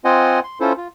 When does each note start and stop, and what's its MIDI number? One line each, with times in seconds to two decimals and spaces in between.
0.05 0.40 60
0.05 0.40 65
0.05 0.40 72
0.05 0.40 75
0.05 0.40 78
0.05 0.40 80
0.44 0.59 84
0.60 0.73 61
0.60 0.73 64
0.60 0.73 65
0.60 0.73 69
0.60 0.73 72
0.77 0.88 65